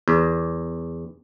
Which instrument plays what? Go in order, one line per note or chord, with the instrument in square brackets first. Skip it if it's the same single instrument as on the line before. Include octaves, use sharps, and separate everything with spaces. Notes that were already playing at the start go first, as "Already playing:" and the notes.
[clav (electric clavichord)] E2